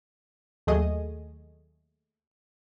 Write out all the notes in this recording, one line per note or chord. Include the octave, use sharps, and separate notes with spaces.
D#2 F#3 A3 G#4 D#5 D#6